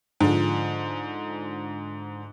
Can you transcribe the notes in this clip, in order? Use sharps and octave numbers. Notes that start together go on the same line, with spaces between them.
G#2 D3 F3